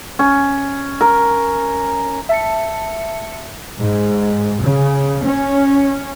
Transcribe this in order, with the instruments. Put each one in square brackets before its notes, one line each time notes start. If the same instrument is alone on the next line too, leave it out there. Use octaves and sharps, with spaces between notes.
[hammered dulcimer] C#4
A#4
[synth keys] E5 A5 C#7
[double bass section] G#2
C#3
C#4